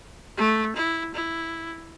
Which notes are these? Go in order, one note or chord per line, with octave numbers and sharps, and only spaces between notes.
A3
E4
E4